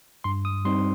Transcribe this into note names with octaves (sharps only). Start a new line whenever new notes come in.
G2 C6
D#6
G3 C4 D#4 C6